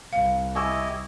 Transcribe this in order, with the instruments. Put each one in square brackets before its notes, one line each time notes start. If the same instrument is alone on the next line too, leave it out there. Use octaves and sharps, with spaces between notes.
[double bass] C2 [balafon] F5
[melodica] E4 G4 D#5 [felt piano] G#5 C#6 E6